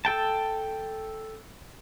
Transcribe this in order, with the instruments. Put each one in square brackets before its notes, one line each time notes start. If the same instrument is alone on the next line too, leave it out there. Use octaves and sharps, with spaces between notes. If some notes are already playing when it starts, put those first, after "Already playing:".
[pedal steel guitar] A4 G5 A5